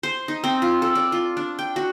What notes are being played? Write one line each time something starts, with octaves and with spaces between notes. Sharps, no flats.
C5
D#4
C4
F4
A4
D5
F4
D4
G5
F#4